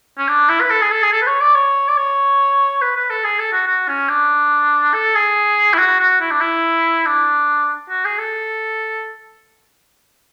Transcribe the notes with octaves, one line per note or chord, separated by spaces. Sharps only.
C#4
D4
E4
B4
A4
G#4
A4
G#4
A4
B4
C#5
D5
C#5
D5
C#5
B4
B4
A4
G#4
A4
F#4
F#4
C#4
D4
A4
G#4
E4
F#4
F#4
E4
D4
E4
D4
F#4
G#4
A4